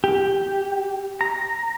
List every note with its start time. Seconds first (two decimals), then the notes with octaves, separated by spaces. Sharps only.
0.04 G4
1.21 A#5